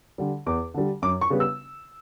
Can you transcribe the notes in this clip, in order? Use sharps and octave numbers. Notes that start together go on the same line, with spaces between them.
D3 G3
E2 D6
D3 G3
F#2 D6
C#6
C#3 G3 B3
E6